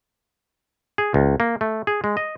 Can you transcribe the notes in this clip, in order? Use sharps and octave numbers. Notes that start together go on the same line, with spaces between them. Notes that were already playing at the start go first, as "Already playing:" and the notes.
G#4
C#2
A#3
A3
G#4
G#3
D#5